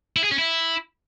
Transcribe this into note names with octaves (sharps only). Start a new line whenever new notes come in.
E4
G#4
C#4
E4